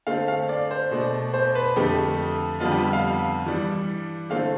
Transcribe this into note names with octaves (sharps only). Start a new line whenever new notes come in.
D3 A3 C4 F5
F5
D5
C5
B2 A3 D4
C5
B4
F2 D3 A3 G4
F2 D3 G3 B3 F4
G4
F5
G2 E3 G3 D4
D3 A3 C4 F5